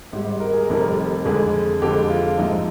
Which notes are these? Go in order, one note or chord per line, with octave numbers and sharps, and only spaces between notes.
G#1 G#2 G3
A#4
G#4
A#4
F1 F2 D#3 G3
F2 D3 G#3 G#4
F2 D3 G#3 G4
F4
A#1 G#2 F3 D#4